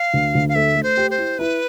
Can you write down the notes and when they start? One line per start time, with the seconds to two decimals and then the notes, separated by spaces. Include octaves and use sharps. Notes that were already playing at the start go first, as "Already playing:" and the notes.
Already playing: F5
0.14 D2
0.35 D2
0.49 F5
0.55 A3 E5
0.76 A3
0.83 C5
0.97 G4
1.11 C5
1.18 E4
1.39 E4 B4